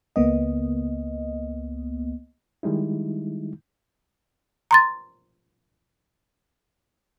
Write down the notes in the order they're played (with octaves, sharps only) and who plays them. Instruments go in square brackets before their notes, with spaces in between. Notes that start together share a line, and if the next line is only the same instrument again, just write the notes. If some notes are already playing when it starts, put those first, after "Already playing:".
[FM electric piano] C#2 A#3 B3 D#5
[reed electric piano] D#3 G3 G#3 D#4 E4
[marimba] A#5 C6 A6